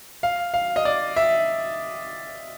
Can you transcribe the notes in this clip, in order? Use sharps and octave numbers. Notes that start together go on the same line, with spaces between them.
F5
F5
D#5
D5
E5